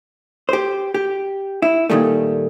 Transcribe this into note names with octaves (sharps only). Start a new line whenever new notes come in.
G4 C5
G4
E4
A#2 D3 D#3 G3 A3